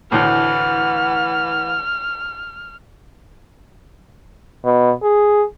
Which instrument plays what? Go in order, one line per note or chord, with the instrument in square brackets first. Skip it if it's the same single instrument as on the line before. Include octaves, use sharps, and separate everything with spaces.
[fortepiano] D2 A2 [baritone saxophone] E3 [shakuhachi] F#5 [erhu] F6
[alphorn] B2
G#4